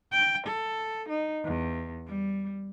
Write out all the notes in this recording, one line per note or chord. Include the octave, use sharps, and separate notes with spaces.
G5
A4
D#4
E2
G3